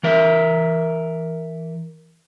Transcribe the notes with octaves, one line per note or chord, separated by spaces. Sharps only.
E3 A#4 E5